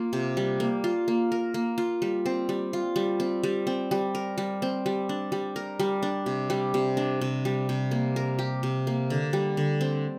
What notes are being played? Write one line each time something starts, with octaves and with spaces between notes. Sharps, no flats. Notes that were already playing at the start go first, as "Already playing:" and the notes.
Already playing: A#3 F4
C3
G3
A#3
F4
A#3
A#4
A#3
F4
G3
C4
G3
F4
G3
C4
G3
C4
G3
A#4
G3
C4
G3
D4
G3
A#4
G3
D4
C3
G3
C3
D4
C3
G3
C3
A#3
A#4
G4
C3
A#3
D3
G3
D3
C4